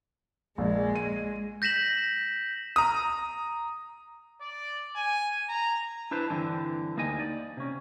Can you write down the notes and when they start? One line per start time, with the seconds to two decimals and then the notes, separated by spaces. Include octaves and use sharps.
0.58 A#1 G#3
0.96 D#7
1.62 G6 A#6 B6 E7 F#7
2.76 A#5 D#6
4.41 D5
4.96 G#5
5.49 A#5
6.11 D4 E4 B4 C5 A5
6.30 G2 D3 E3 C4
6.96 D2 A#3 D#4 G4 D#5 G#5
7.19 D5
7.57 C3 C#4